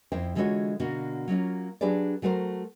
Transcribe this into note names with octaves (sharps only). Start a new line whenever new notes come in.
F2 E4 C5 G5
D3 E3 G#3 F4 F#4 C#5
B2 D3 A#3 F#4
F#3 A#3 C#4 F4
F#3 D4 G4 G#4 B4 D5
F#3 A3 F#4 A#4 C5